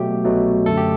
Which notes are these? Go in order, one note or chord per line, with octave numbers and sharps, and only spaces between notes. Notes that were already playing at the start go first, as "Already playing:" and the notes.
Already playing: B2 F#3 A3 G4
C2 B2 F#3 A3
F#2 D3 A3 A4
G4